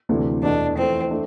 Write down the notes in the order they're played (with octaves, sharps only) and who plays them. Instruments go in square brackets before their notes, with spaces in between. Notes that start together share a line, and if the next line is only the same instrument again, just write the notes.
[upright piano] D2 C3 E3 A3 D4
[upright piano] E2 B2 A3 [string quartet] D4
[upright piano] F2 E3 A3 [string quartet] C4
[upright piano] A3 D4